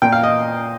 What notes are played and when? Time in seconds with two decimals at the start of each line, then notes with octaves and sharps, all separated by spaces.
0.02 A#2 G5
0.12 F5
0.23 D#5